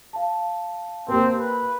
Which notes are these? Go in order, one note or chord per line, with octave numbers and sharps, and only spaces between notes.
F5 A5
A#3 C4 G4
B4